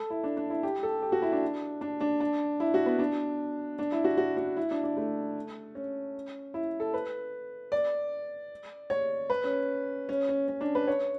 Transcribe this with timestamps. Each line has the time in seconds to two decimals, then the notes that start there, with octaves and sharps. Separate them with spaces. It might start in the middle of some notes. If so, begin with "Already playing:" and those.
Already playing: A4
0.10 E4
0.24 D4
0.37 D4
0.50 E4
0.63 G4
0.83 A4
1.02 G4
1.12 F#4
1.22 E4
1.32 D4
1.81 D4
2.01 D4
2.20 D4
2.60 E4
2.74 F#4
2.86 B3
2.99 D4
3.79 D4
3.92 E4
4.04 F#4
4.17 F#4
4.37 F#4
4.57 E4
4.71 D4
4.84 D4
4.97 A3
5.75 C#4
6.54 E4
6.80 A4
6.94 B4
7.72 D5
8.90 C#5
9.30 B4
9.44 C#4
10.09 C#4
10.29 C#4
10.48 C#4
10.61 D4
10.75 B4
10.88 C#5